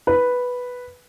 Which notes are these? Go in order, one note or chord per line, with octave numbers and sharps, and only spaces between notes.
B4